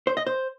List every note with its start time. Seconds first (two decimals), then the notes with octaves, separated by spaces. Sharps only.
0.07 C5
0.17 D#5
0.27 C5